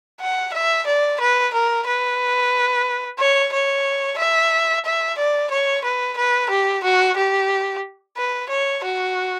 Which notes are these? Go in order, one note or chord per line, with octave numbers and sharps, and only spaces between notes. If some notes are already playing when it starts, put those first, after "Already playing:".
F#5
E5
D5
B4
A#4
B4
C#5
C#5
E5
E5
D5
C#5
B4
B4
G4
F#4
G4
B4
C#5
F#4